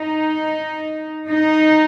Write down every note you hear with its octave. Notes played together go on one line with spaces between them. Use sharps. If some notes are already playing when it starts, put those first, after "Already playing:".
Already playing: D#4
D#4